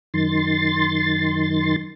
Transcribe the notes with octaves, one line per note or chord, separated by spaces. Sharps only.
F#2 D#3 C6 A6